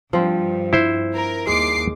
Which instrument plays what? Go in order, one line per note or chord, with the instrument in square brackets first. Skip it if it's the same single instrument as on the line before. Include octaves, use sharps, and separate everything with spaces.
[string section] G2 [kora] F3 C4
[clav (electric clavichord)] E4 C5
[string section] A#4
[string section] D#2 D6 C7 [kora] G#3